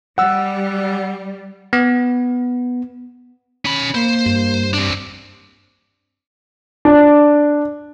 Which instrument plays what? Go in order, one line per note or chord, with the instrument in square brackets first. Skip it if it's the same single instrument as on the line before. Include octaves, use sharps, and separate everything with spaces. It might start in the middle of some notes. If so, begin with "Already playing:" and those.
[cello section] G3 [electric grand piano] F#5 E6
[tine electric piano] B3
[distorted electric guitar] C#4 B5
[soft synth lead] A#3 [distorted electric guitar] C5
[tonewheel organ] G2
[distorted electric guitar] C4 D4
[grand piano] D4